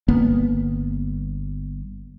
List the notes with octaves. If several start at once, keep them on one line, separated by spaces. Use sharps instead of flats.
G1 A#3 B3